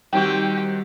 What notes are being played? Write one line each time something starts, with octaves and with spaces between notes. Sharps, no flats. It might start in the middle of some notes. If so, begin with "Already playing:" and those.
D#3 G3 C4 F#4 G4 G5